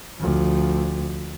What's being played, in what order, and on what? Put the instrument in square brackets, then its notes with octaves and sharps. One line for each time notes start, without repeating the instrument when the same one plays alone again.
[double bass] D2 F3